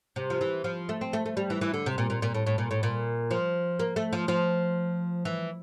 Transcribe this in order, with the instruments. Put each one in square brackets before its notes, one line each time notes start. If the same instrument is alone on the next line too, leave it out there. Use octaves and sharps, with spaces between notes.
[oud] C3
F3
E3
F3
A3
C4
A3
A3
G3
E3
E3
D3
C3
A#2
A#2
A#2
A2
A2
A#2
A2
A#2
F3
A#3
A3
F3
F3
E3